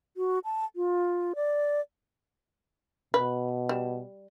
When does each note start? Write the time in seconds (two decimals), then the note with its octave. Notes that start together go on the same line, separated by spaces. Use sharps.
0.17 F#4
0.45 A5
0.76 F4
1.35 D5
3.14 B2 B4
3.69 G3